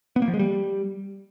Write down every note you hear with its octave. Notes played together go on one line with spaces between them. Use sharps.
B3
A#3
F3
G#3
G3